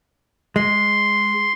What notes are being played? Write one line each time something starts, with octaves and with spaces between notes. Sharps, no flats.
G#3 C6